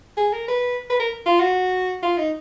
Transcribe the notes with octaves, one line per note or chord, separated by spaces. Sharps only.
G#4
A#4
B4
B4
A#4
F4
F#4
F4
D#4